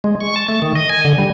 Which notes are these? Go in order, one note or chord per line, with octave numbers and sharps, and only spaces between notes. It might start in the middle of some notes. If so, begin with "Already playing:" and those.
G#3
C#6
A5
A3
D#3
D#5
G#5
D3
G3